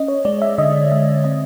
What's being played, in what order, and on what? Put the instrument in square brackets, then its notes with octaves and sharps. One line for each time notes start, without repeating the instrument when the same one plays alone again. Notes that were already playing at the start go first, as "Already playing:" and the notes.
Already playing: [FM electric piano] C#4 D#5
C#5
G#3 D5
E5
D3 D#5
G#3 E5
C4 D#5